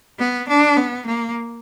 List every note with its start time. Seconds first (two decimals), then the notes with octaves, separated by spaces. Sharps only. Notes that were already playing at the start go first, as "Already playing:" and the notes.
0.19 B3
0.48 D4
0.77 B3
1.06 A#3